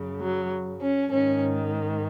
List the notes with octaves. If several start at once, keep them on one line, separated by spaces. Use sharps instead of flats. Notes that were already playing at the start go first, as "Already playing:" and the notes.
Already playing: F#2 C#3
F#3
C#4
G#2 D#3 C#4